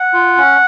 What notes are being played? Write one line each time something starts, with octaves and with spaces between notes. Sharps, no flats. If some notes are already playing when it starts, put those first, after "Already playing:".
Already playing: F#5
F4
C#4